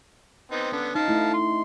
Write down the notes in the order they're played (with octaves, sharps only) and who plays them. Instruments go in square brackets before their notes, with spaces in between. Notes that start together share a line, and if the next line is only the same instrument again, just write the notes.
[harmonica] B3 C4 D#4
[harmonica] D3 B3 [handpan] C#4
[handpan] D#4 [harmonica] F5 A5
[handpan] A3 E4
[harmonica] C6